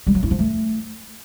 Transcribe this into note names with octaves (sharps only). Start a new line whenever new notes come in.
G3
F#3
E4
F3
A3